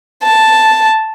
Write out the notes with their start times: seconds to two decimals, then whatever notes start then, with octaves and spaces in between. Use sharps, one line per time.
0.23 A5